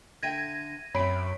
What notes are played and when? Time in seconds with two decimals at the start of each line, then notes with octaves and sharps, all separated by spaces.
0.23 D3 E5 G5 G#6 A#6 D#7
0.95 F#2 C4 C#5 E5 B5 D7